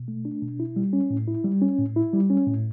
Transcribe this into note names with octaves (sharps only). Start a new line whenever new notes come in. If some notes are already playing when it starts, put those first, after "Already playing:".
Already playing: B2
A3
D4
B2
E4
G3
C#4
A2
E4
G3
C#4
A2
E4
G3
C#4
A2